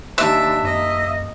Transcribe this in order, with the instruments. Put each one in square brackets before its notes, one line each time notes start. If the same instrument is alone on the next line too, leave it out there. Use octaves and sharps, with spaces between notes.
[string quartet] D#2 D4 [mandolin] E5
[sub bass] F#2 [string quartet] A#3 D#5